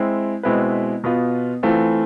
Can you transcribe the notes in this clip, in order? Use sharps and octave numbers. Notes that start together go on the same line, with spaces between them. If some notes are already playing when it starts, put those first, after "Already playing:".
Already playing: G#3 C4 E4
B2 G#3 C4 E4 B4
B2 B3 F4
E3 A3 C4 F4